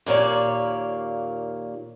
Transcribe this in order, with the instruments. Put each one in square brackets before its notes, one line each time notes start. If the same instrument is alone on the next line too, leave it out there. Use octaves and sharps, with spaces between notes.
[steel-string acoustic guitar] D#2 A#2 A#3 C#5 D5